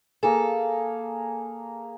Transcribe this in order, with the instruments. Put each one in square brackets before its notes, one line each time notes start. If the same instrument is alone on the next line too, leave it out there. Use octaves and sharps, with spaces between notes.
[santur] A#3 G#4 [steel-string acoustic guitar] A4